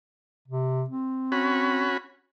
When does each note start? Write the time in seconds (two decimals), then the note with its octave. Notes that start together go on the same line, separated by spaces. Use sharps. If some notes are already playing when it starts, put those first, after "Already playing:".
0.48 C3
0.89 C4
1.32 C#4 F#4 B5